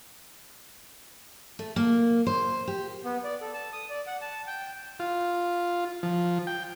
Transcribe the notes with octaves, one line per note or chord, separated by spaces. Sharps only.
A3
A#3
C5
G4
B3
D5
A4
A5
D#6
D5
F#5
A5
G5
F4
F3
G5